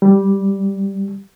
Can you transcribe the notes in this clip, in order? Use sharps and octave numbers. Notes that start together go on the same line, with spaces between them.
G3